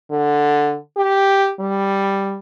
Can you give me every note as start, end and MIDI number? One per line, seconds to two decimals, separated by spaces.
0.11 0.76 50
0.97 1.52 67
1.60 2.38 55